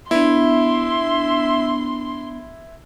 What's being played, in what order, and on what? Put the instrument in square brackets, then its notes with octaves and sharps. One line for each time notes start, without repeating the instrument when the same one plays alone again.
[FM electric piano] B3 D4 [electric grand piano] E4 [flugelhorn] E5 [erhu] C6